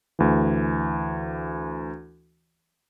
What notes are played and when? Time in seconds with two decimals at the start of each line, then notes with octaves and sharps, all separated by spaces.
0.19 D2 E3